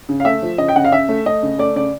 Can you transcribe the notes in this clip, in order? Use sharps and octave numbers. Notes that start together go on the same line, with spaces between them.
C#3
F5
A3 E5
F3
C#3 D#5
G5
C#3 F#5
F5
C#3 E5
A3
A3 D#5
C#3
A3 D5
C#3 D5